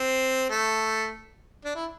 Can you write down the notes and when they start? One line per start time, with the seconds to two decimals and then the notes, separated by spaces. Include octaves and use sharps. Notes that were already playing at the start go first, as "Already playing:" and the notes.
Already playing: C4
0.50 A3
1.65 D4
1.75 E4